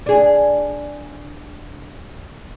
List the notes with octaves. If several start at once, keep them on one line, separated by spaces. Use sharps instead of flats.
D4 G#4